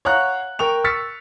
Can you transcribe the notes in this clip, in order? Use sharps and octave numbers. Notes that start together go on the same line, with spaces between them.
C#5 F5 F#5 A#5 C#6 F#6
A#4 G5 C#6 F7
C#6 E6 F6 A6 B6 C#7